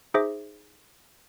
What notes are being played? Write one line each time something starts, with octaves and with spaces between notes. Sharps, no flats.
D#4 G#4 C5 E5 D6 A#6